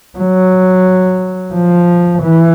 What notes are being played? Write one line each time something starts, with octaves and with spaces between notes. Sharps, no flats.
F#3
F3
E3